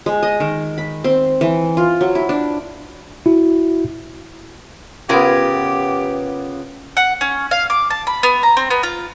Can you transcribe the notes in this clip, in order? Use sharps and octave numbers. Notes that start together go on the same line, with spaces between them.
G#3
D#5
D#3
B5
C4
E3
F4
F#3
E4
D4
E4 F#4
C#3 B3 F4 G4 A#4 G#5
F#5
C#4
F5
D6
A5
B5
B3
A#5
C4
B3
F4